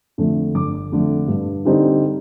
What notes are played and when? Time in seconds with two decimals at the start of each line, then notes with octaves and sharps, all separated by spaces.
0.18 F2 D3 A3
0.54 G1 D6
0.92 F2 D3 A3
1.28 G2
1.65 D3 G3 C4 D#4